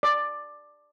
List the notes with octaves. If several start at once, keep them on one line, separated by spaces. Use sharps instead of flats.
D5